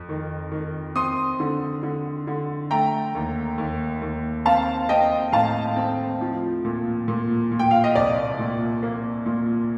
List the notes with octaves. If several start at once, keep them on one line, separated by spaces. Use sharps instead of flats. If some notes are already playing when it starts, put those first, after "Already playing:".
Already playing: F2
D#3
D#3
C4 C6 D#6
D3
D3
D3
A3 G5 A#5
D#2
D#2
D#2
C4 F5 A5
C4 D#5 G5
A2 F5 A5
C4
F3
A#2
A#2
A#2
G5
F5
D#5
C2 D5
A#2
A#3
A#2